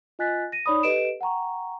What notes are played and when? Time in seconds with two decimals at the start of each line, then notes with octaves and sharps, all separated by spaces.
0.19 F4 D#5 G#5 F#6 A6 B6
0.52 A#6 D#7
0.66 D#4 C#5 D5 B5 D#6
0.83 G4 A4 B4 D#5 D7 E7
1.21 F#5 G5 A#5 C#6